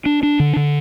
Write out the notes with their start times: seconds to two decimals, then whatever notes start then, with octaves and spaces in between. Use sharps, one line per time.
0.06 D4
0.23 D4
0.40 D3
0.57 D3